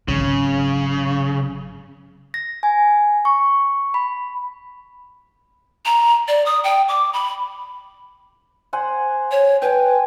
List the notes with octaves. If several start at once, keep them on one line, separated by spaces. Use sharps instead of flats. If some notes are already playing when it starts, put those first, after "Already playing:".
G#1 C#3 F#3
A#6
G#5
C#6
B5
A#5
D5
D#6
G5
D6
B5
C5 F#5 G#5
C#5
B4 G5 G#5